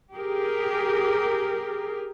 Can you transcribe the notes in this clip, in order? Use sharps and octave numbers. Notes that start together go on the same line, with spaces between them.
G4 G#4 A#4